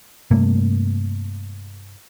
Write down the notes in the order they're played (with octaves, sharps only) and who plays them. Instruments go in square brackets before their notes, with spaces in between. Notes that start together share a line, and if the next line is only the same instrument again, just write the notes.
[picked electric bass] G2 C3 A3 A#3